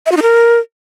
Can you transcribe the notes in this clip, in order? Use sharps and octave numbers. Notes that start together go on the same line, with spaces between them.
E5
F#4
D#4
A#4